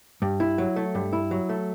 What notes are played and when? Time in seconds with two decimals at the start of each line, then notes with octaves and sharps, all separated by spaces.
0.22 G2
0.40 E4
0.58 F#3
0.76 A3
0.95 G2
1.13 E4
1.31 F#3
1.49 A3